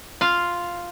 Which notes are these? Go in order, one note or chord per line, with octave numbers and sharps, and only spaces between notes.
F4 F5